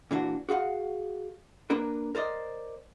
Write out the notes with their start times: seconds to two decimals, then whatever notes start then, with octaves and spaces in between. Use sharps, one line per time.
0.11 A#2 E3 D4 F#4
0.49 F#4 G#4 F5 F#5
1.70 A#3 D4 A#4 B4
2.15 A#4 C5 D5 D#5